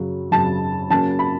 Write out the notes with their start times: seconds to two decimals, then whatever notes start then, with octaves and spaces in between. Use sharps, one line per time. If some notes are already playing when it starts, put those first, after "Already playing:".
Already playing: F#2 C#3 F#3
0.31 F#2 C#3 F#3 A5
0.90 C#3 F#3 A#3 C#4 A5
1.19 B5